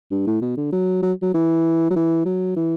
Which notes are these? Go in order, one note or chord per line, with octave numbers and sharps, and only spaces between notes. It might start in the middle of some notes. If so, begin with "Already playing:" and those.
G2
A2
B2
D3
F#3
F#3
F#3
E3
F#3
E3
F#3
E3